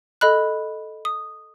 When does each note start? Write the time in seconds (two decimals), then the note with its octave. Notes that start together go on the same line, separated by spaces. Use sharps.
0.21 A4 D#5 B5 F#6
1.05 D#6